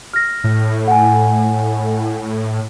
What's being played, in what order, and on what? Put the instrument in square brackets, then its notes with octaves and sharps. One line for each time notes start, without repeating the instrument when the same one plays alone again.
[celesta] F6 A#6
[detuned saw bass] A2
[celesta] F#5 G#5